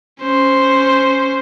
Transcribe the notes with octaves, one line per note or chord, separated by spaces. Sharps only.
C#4 C5